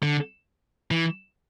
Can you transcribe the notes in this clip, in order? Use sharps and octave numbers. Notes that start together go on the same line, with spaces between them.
D3
E3